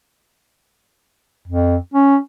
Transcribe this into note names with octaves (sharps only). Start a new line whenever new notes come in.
F2
C#4